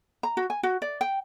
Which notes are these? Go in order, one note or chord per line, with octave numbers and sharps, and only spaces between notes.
A#5
F#4
G#5
F#4
D5
G5